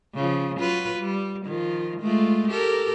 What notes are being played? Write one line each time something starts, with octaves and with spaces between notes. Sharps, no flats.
C#3 F3
F#3 F4 B4
G3
D#3 F3 F4
G#3 A3 F4
G4 A4 A#4